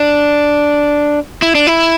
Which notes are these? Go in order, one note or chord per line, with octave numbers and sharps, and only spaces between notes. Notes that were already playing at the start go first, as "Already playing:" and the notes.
Already playing: D4
E4
D4
E4